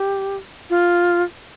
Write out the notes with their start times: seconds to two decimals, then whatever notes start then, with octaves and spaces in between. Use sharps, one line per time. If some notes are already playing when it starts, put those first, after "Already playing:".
Already playing: G4
0.70 F4